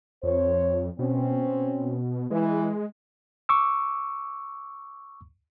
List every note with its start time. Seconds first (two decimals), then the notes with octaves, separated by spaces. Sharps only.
0.23 F2 C5 C#5
0.99 B2 C4 C#4
2.31 E3 G#3
3.49 C#6 D6 E6